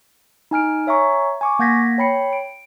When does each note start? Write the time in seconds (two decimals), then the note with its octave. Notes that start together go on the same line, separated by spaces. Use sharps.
0.51 D#4 G#5 F6 D7
0.87 C#5 E5 G#5 A#5 C#6
1.41 G#5 C#6 D6
1.59 A#3 F#5 G6 G#6 A#6 B6
1.98 C#5 G5 B5 C7 C#7
2.33 D7